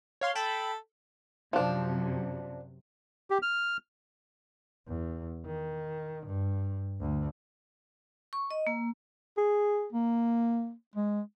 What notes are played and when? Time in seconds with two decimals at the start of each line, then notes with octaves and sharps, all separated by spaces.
0.21 C#5 F5 C6
0.35 A4 G5 A5 B5
1.53 F#2 C3 F3 D4
3.30 G4
3.42 F6
4.88 E2
5.46 D#3
6.26 G2
7.00 D2
8.33 C#6
8.51 D#5
8.67 A#3
9.38 G#4
9.93 A#3
10.96 G#3